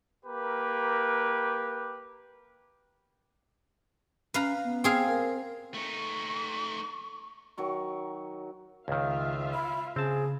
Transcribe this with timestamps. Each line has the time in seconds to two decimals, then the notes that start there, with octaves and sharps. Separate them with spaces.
0.25 A#3 G4 A#4 B4
4.34 C#4 B4 F5 A#5
4.65 B3
4.84 C4 G#4 F5
5.08 A#4
5.74 A3 D#4 C#6
7.57 D#3 F#3 C#6
8.88 C#2 D#3 F4 E5 F5
9.54 B5
9.96 C#3 C4 G#4 A5